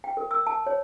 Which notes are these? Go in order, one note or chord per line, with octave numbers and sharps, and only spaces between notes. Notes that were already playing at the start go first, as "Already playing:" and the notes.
G5
A#4
E6
A5
C#5